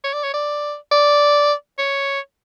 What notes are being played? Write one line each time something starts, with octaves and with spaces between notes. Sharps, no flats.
C#5
D5
C#5
D5
D5
C#5